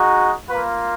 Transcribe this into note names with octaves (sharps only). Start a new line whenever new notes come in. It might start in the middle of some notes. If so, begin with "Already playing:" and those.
Already playing: G#3 D#4 F#4
A#3 F4 B4